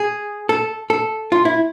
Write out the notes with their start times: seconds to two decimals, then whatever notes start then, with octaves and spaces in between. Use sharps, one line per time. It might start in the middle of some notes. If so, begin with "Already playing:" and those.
Already playing: G#4
0.49 A4
0.90 A4
1.32 F4
1.45 E4